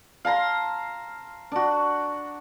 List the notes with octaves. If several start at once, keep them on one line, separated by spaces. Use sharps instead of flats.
F5 A5 A#5 C6
D4 F#4